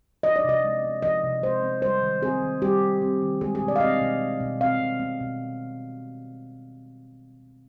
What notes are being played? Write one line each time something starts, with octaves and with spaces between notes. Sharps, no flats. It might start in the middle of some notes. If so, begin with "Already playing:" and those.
F3 D#5
D5
C3 D#5
G#3
B3
F3 D#5
C3
G#3 C5
B3
G3 C5
D#3
C4 G#4
D#3
G3 G4
D#3
C4
D#3
G#3 G#4
G#4
B2
D5
F5
C4 D#5
B2
G#3
B2
C4 F5
B2
B3
B2